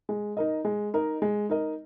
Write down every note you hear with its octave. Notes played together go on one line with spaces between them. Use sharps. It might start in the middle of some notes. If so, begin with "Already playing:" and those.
G#3
D#4 A#4 D#5
G#3
D#4 A#4 D#5
G#3
D#4 A#4 D#5